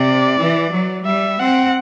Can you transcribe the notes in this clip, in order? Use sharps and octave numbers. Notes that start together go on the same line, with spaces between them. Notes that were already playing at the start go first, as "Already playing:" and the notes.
Already playing: C3 D5
E3
F#3
G3 E5
C4 F#5